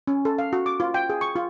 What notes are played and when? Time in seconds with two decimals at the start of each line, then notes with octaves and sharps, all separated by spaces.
0.07 C#4
0.25 A4
0.39 F5
0.53 F#4
0.66 D6
0.80 F4
0.94 G5
1.10 G#4
1.21 C#6
1.36 F4